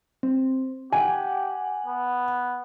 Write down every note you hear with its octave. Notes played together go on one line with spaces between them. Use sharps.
C4
G4 F#5 G#5
B3